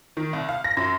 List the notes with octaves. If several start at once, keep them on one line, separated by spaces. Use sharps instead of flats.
D#3
C2
F5
A#6
F#2